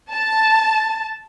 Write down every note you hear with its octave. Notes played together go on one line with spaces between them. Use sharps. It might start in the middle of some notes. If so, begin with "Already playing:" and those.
A5